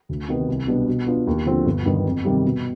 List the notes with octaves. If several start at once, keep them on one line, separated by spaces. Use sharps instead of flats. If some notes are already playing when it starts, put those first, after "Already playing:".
D2
C3 D#3 B3
C2
B2 G3 B3 D4
B2
B3 D4 F4
D#2
D3 F3 C4 F4
G1
G2 D#3 B3
F2
C3 D#3 G3
B2